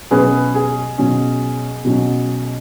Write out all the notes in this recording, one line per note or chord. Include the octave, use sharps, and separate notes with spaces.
B2 F#3 C#4 G#4 B4
G#4
B2 F#3 C#4
B2 F#3 C#4